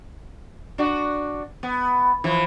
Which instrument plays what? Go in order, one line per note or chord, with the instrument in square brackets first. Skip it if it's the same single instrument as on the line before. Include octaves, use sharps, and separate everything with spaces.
[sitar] D4 F#4
B3
E3 F3